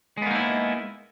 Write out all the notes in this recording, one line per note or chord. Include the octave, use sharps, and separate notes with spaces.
G#3 A#3 B3 D#4 E4